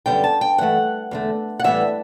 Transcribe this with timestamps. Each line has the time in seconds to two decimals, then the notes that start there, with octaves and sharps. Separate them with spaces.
0.06 F#2 D3 G3 B3 G5
0.24 A5
0.41 G5
0.58 G2 E3 A3 F#5
1.11 E2 D3 A3
1.59 F#5
1.64 A2 E3 G3 B3 E5